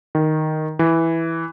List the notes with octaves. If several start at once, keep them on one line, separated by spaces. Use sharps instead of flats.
D#3
E3